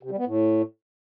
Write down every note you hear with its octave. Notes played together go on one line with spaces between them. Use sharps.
C3
G3
B3
A2